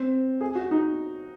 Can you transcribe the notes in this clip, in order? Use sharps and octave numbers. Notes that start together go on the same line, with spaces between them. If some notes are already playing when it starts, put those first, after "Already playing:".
Already playing: C4
G#4
F#4
D#4